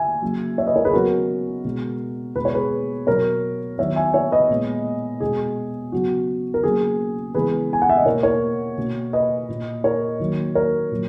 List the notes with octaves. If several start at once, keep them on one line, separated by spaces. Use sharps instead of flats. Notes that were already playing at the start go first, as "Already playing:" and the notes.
Already playing: E5 G#5
C#3 F#3 A#3
C#5 E5
B4 D#5
A#4 C#5
G#4 B4
C#3 F#3 B3 F#4 A#4
B2 G#3 B3
B2 G#3 B3 B4
C#5
G#4 B4
B2 F#3 B3 A#4 C#5
D#3 F#3 B3 C#5 E5
E5 G#5
C#5 E5
B4 D#5
A#2 G#3 B3
B2 G#3 B3 G#4
C#3 F#3 B3 F#4
A#4
C#3 F#3 A#3 G#4
C#3 E3 G#3 B3 G#4 B4
G#5
F#5
E5
D#5
B2 A#3 A#4 C#5
A#4 C#5
B2 A#3
B4 D#5
A#2 A#3
A#4 C#5
D#3 F#3 A#3
A#4 C#5
A#2 F#3